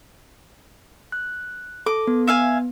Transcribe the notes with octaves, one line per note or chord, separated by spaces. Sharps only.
F#6
A4 D6
B3
E5 F5 G#5